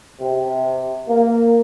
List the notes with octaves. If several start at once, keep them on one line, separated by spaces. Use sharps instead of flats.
C3
A#3